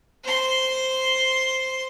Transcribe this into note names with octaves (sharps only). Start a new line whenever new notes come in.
C5 C6